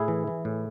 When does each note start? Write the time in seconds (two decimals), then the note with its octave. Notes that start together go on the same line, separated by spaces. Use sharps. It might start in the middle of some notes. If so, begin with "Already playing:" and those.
Already playing: A2 E4 G#4
0.08 E3
0.27 E3
0.45 A2